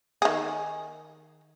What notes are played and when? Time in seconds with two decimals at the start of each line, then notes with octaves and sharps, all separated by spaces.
0.22 D#3 G#4